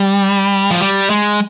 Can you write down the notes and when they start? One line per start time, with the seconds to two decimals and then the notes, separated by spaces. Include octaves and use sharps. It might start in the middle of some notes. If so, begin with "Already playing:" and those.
Already playing: G3
0.71 F3
0.81 G3
1.10 G#3